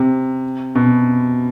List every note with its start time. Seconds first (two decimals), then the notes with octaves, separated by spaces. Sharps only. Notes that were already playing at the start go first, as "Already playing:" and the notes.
Already playing: C3
0.75 B2